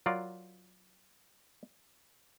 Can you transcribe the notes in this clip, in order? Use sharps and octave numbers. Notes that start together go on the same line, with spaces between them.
F#3 F4 A#4 D5